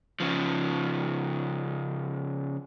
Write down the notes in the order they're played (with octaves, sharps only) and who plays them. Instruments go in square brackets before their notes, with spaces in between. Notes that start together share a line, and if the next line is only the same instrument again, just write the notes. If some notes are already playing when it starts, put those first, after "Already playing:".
[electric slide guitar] C#3 F3